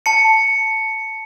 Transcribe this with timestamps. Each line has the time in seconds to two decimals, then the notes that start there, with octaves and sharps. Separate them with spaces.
0.06 A5 C#7